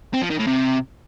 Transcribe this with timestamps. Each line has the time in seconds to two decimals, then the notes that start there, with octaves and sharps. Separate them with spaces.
0.13 C4
0.22 F3
0.30 D#3
0.39 A2
0.47 C3